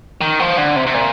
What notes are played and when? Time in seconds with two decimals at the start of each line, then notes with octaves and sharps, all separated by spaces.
0.21 D#3
0.40 F3
0.57 D3
0.76 C3
0.87 C3
0.94 A#2